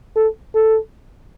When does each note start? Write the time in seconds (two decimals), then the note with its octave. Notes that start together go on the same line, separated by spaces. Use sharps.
0.16 A4
0.55 A4